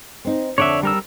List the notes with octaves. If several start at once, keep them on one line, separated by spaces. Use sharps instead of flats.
C4 D#4
F2 D3 D4 C#5 D5 E5
G3 A#4 E6